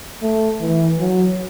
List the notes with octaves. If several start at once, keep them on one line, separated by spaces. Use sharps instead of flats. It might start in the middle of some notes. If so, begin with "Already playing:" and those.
A3
E3
F#3